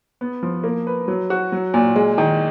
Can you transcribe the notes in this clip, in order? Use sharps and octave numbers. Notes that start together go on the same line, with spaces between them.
B3
F3
A#3
B4
F#3
F#4
F#3
A#2
G#3
D#3